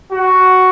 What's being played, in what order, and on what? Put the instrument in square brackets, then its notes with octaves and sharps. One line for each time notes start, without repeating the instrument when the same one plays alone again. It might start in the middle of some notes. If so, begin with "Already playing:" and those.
[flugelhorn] F#4